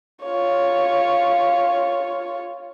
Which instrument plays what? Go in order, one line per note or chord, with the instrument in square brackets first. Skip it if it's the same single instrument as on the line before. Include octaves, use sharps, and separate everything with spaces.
[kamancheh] F4 C#5